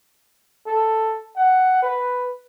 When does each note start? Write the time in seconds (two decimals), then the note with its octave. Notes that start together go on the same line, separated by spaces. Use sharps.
0.66 A4
1.36 F#5
1.82 B4